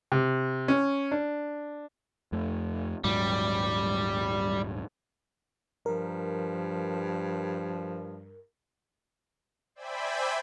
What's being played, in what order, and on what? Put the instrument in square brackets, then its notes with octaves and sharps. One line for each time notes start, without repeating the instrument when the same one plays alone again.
[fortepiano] C3
C#4
D4
[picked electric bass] F2 A3
[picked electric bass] D#1 G#2 F#3 [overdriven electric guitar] G3
[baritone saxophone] G2 [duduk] F3 [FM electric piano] A#4
[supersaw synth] C5 D5 E5 G5 G#5 B5